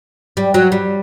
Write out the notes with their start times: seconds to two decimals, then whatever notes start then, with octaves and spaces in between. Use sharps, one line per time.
0.37 G3
0.54 F#3
0.72 G3